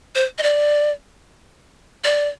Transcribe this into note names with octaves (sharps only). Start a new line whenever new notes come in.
C5
D#5
D5
D5